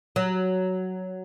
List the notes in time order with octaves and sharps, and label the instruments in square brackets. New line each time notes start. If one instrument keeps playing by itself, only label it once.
[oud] F#3